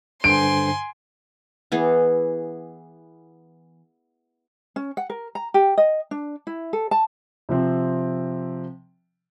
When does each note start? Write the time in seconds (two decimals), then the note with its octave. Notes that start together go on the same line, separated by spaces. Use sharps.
0.24 G2 D3 C5 G#5 C6 D7
1.72 E3 B3 G#4
4.76 C#4
4.97 F#5
5.10 A#4
5.35 A#5
5.54 G4
5.78 D#5
6.11 D4
6.47 E4
6.73 A4
6.91 A5
7.49 C3 F3 C4